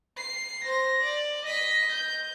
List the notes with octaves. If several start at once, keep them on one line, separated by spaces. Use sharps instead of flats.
C7
C5 A#6
D5
D#5 B6
G6